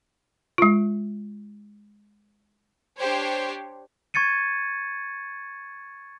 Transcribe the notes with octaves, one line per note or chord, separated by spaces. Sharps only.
G#3 F4
D4 G4 C5 C#5
C#6 G#6 A6 C#7 D#7